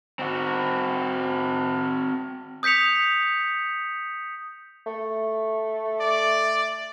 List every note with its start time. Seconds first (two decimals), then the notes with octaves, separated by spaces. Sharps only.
0.19 C4 F#4
2.63 D#6 G6 B6 C#7 F7
4.87 A3
6.00 D5